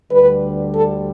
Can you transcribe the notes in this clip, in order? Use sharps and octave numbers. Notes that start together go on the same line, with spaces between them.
D2 D3 G3 B4
A4